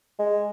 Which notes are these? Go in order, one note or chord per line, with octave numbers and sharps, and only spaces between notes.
G#3